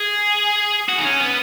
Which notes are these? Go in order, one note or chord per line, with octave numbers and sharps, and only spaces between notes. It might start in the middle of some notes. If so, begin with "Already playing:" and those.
Already playing: G#4
F#4
D#4
C#4
B3